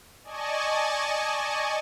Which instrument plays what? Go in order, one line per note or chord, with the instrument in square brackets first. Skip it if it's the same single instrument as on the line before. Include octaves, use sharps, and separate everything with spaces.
[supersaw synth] D5 D#5 G#5 A5 C#6